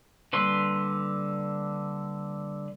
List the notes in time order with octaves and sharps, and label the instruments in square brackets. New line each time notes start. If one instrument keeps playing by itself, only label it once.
[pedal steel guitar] D3 B4 C6 [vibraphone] G3 A#3 E6